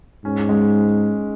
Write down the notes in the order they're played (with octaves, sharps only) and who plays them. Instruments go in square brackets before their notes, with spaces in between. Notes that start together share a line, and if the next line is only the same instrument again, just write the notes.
[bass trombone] G#2 [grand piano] C#4
[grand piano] G#3